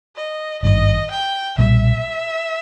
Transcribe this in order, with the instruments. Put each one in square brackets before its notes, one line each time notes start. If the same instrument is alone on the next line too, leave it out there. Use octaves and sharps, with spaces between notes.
[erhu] D#5
[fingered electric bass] G#1 G2 D#3 [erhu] D#5
[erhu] G5
[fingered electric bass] B1 A#2 G3 [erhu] E5